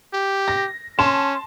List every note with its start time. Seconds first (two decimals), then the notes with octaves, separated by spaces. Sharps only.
0.13 G4
0.48 A#6
0.99 C#4 A5 C6 E7